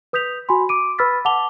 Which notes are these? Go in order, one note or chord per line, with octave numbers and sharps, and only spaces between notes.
B4 D#6 G6 B6 F7
F#4 G#5 B5 C6
D6 D7 D#7
B4 B5 E6 F6 A6 B6
F#5 A5 D6 F7 G7